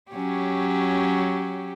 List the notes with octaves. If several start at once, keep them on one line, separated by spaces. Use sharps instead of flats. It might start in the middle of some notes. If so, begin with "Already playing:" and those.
F#3 C#4 G4